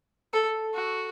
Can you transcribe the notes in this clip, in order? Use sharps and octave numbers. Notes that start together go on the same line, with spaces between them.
A4
F#4